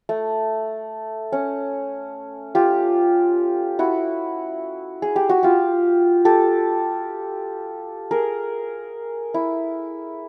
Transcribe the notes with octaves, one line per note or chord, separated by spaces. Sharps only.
A3
C#4
F4 G4
E4 F#4
G#4
G4
F#4
F4 G4
G4 A4
G#4 A#4
E4